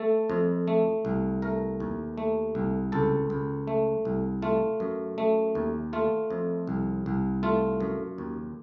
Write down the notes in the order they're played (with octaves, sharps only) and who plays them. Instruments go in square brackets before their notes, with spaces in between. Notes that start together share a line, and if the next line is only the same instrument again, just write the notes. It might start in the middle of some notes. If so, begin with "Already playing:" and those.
Already playing: [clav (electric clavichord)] A3 A4
F2
A3
C2
A3 A#4
D#2
A3
C2
C#2 A4
C#2
A3
C2
A3 F4
F#2
A3
D#2
A3 F4
F2
C2
C2
A3 F4
F#2
D#2